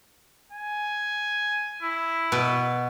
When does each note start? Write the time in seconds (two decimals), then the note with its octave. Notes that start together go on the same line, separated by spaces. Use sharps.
0.52 G#5
1.82 E4
2.32 B2